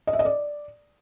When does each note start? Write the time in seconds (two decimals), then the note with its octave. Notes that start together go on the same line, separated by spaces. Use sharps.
0.07 D#5
0.13 E5
0.19 D#5
0.25 D5